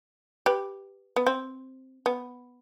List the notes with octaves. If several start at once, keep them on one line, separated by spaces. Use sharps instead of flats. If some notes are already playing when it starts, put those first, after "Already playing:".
G4 B4
B3
C4
B3